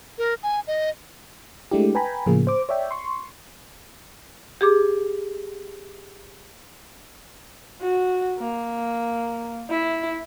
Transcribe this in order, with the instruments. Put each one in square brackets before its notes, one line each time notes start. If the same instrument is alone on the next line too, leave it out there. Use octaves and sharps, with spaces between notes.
[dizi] A#4
G#5
D#5
[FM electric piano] G#3 A3 D4 E4 G4
B4 G5 G#5 A#5 B5
A2 C#3 F3 A#3 G#4
C5 D6
C#5 D5 E5 G5
C6 C#6
[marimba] G4 G#4 D6
[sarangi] F#4
A#3
E4